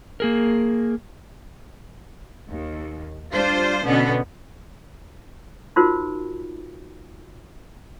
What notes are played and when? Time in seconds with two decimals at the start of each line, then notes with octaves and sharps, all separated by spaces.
0.20 A#3 G#4 A#4
2.50 D#2
3.32 G3 D4 F4 C5
3.83 B2 D3 B3 C#4
5.76 D#4 F4 F#4 A#4 C5